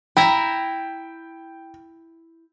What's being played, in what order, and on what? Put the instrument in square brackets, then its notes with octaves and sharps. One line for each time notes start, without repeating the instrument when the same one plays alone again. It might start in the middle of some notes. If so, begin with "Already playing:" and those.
[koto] E4 E5 A#5 [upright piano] G5